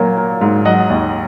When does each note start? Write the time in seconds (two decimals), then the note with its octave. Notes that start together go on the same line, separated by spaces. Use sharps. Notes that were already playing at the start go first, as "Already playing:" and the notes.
Already playing: A#2 F#3 A#3
0.17 A#3
0.41 G#2
0.65 F#3 D#5 F#5
0.90 D#2